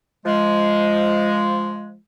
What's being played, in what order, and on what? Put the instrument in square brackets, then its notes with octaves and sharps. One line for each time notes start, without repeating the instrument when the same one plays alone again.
[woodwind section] F3 G#3